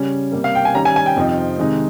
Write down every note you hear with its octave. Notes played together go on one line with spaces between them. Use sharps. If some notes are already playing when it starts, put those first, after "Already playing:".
Already playing: C#3 G3 C#4
C3 G3 A#3
F5
G5
G#5
D#3 G3 C#4 A#5
G#5
G#5
G5
F2 C3 F3 C4 D#4
C3 D#3 G#3 D#4